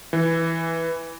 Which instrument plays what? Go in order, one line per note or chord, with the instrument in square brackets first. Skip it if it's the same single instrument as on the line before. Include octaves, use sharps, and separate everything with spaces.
[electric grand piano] E3